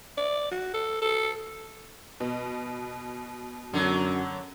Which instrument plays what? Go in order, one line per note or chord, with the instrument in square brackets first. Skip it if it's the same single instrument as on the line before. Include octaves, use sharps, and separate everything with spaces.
[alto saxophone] D5
F#4
A4
A4
[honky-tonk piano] B2
[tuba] F#2 [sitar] D3 F#3